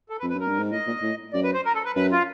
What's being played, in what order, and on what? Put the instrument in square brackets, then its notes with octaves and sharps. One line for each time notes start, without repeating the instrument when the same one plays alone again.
[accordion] A4
B4
[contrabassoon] F2
[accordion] B4
[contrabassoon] F#2 [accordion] A#4
[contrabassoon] G2
G#2
[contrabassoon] A2 [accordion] D#5
[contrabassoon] A#2
A2
[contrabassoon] F#2 [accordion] D5
[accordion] B4
C5
A#4
A4
B4
[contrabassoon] F#2 [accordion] B4
[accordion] F4